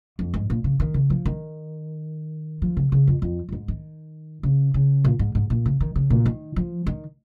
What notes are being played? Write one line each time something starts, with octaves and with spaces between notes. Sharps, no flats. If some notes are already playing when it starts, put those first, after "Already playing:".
F2
G#2
A#2
C#3
D#3
C#3
F3
D#3
F3
C#3
C#3
F2
F2
F2
G#2
D#3
C#3
C#3
A#2
G#2
G#2
A#2
C#3
D#3
C#3
A#2
D#3
F3
D#3